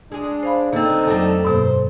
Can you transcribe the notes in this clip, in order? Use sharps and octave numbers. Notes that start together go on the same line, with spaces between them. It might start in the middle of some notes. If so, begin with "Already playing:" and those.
G#3 D4 G#4
C5 F5 B5
D3 A#3 C4 D#4 A4
F2 F#3 A3 D4
G2 B2 A#3 C5